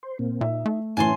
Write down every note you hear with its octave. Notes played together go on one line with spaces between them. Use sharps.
C5
A#2 A#3 C4
A#2 D#4 E5
A3
A2 E3 C#4 G#5 A5 C6